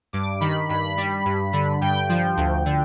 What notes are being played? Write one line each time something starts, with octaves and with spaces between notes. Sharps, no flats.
G2 D6
D#3 B5
G2 B5
G3
G2
D3
G2 G5
F3
D2
D3